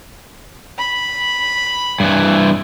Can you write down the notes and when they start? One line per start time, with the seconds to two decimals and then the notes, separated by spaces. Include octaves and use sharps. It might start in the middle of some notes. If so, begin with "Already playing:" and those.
0.78 B5
2.00 G2 E3